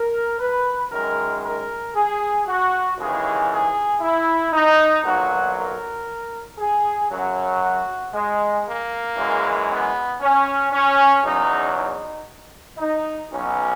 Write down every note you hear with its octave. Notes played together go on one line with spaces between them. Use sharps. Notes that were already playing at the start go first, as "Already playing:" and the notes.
Already playing: A#4
B4
F#2 D#3 G#3 A#4
A#4
G#4
F#4
D#2 C#3 E3 G#3 G#4
G#4
E4
D#4
B1 A#2 F#3 F#4
A#4
G#4
F#2 C#3 F#3
F#4
G#3
A#3
F#2 E3 G#3
B3
C#4
C#4
E2 C#3 F#3 D#4
D#4
D#4
B1 B2 F#3 C#4